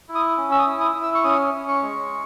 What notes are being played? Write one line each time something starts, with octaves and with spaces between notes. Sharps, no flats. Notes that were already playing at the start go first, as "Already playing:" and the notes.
E4
D#6
C#4
E6
D#6
E4
D#6
E4
E6
C#6
C#4 D#6
C#4
C#6
G#3